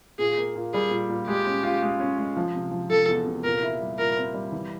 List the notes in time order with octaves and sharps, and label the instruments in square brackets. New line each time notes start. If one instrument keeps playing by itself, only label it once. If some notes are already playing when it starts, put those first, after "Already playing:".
[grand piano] A#2 [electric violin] G#4
[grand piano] A#3
A#2
[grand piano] G3 [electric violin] G#4
[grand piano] A#2
A#2
[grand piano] G#3 [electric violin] G4
[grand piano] C#4
F4
G#3
C#4
G#3
F3
C3
F3
[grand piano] F3 [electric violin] A4
[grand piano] E2
C3
[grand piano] A#2 [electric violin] A#4
[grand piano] E4
G3
[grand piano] A#2 [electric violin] A#4
[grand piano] C4
G3
E3